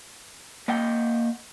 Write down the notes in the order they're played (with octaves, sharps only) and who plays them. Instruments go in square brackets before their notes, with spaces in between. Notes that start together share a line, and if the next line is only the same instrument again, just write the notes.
[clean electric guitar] A#3 D#5 F#5 G5